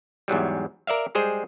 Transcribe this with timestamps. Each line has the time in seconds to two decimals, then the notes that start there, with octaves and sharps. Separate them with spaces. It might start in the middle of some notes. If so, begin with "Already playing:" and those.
0.28 E2 G#2 F#3 G3
0.87 A#4 D5 E5 F5
1.15 G3 G#3 G#4 C5